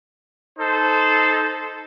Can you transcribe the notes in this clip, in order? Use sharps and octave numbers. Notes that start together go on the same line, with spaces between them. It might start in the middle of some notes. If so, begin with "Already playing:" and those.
D#4 A4 C5